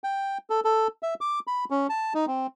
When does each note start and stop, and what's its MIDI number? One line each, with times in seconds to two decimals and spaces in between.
0.04 0.38 79
0.50 0.60 69
0.64 0.88 69
1.03 1.14 76
1.21 1.39 86
1.47 1.65 83
1.70 1.87 61
1.90 2.13 81
2.14 2.25 63
2.27 2.47 60